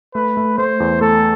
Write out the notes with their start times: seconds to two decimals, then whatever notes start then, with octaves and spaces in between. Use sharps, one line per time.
0.15 A3 B4
0.37 A3
0.58 A3 C5
0.80 E2
1.01 A3 A4